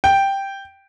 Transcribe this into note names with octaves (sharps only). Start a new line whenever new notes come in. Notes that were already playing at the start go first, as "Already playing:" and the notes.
G5